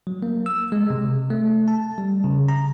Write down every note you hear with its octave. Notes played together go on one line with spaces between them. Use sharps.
F#3
A#3
E6
G#3
C3
A3
A5
G3
C#3
A#5